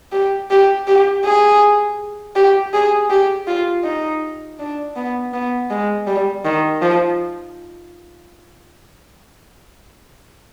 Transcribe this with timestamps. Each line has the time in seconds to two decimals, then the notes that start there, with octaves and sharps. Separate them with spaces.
0.12 G4
0.51 G4
0.87 G4
1.25 G#4
2.36 G4
2.73 G#4
3.10 G4
3.47 F4
3.84 D#4
4.59 D4
4.96 B3
5.33 B3
5.70 G#3
6.07 G3
6.45 D#3
6.82 F3